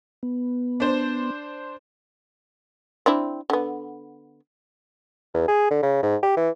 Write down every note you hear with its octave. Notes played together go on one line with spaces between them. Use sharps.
B3
D4 C5
C4 D4 E4
D3 B3
E2
G#4
D3
C#3
G#2
G4
E3